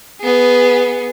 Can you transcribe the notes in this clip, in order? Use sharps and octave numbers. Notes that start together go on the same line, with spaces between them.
B3 G#4